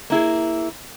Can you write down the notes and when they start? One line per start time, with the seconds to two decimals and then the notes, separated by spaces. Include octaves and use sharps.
0.10 A#3 E4 G#4